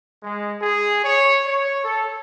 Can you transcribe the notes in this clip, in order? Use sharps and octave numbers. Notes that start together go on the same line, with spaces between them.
G#3
G#4
C#5
C#5
A4